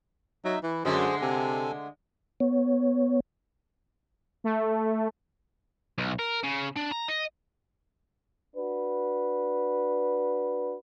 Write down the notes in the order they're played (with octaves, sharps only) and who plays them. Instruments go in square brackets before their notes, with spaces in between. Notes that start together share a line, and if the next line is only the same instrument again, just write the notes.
[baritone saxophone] F#3 [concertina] D#4 E5
[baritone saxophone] E3 [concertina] E4
[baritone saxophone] F#2 [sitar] D3 G#3 A3 [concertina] G#4 C5
[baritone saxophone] C3 [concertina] A4 G#5
[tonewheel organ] B3 C#5
[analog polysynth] A3
[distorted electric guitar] B1
A#4
C#3
D4
A#5
D#5
[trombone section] D4 F#4 B4